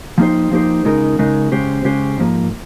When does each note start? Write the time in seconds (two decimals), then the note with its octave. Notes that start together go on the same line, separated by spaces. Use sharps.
0.18 F3 A#3 D#4 G4 C5
0.51 F3 A#3 D#4 G4 C5
0.85 C#2 C#3 G#3 D#4 A#4
1.18 C#2 C#3 G#3 D#4 A#4
1.52 C#3 G#3 C#4 G4 C5
1.85 C#3 G#3 C#4 G4 C5
2.17 G#2 F3 A#3